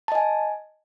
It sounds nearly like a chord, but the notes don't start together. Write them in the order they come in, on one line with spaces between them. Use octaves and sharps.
A5 D#5 G#5